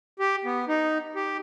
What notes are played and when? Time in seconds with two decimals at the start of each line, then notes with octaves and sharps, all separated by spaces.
0.19 G4
0.45 B3
0.68 D#4
1.16 G4